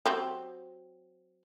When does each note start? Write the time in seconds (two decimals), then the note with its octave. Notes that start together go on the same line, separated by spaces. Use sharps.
0.06 F#3 C4 G4